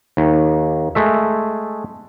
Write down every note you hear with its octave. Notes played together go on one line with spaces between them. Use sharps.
D#2
G#3 A3 E5